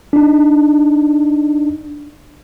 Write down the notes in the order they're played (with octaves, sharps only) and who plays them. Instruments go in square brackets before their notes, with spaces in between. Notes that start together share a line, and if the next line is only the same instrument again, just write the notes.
[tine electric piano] D4 D#4